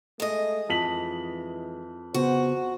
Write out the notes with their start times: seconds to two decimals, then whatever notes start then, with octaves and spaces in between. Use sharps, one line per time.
0.20 G#3 A3 D#5
0.69 F2 E3 B6 F#7
2.14 C#3 B3 F#4 C5